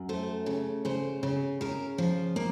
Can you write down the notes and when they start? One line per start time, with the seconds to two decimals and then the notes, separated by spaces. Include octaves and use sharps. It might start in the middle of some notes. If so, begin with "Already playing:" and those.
Already playing: F#2
0.09 A3 C5
0.46 C#3
0.85 C#3 C5
1.23 C#3
1.61 C#3 A#4
1.98 F3
2.36 A#3